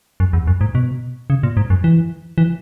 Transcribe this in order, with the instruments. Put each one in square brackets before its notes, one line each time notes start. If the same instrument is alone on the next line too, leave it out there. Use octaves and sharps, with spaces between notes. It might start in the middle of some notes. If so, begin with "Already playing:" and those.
[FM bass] F#2
E2
F#2
G#2
B2
C#3
A#2
G#2
F#2
E3
E3